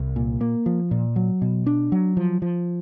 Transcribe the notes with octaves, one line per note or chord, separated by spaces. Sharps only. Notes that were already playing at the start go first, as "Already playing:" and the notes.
Already playing: C2
A#2
A#3
F3
A#2
F#3
B2
D4
F#3
F3
F3